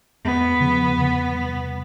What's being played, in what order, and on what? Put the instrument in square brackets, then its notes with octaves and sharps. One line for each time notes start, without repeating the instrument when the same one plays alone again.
[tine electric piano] E2 [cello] B3
[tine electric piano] C#3 F3
E2
C3 E3 G3